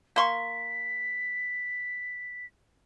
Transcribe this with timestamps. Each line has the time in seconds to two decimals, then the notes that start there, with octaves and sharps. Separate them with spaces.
0.16 A#3 C6 C#6 B6